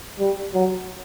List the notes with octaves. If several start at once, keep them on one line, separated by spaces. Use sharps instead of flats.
G3
F#3